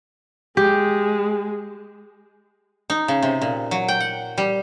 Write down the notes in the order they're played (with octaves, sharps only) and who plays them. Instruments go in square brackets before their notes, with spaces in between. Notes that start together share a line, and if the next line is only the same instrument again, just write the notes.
[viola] G#3 [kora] G4
[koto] D#4
C#3
C3
A#2
F#3
G5
F#5
G3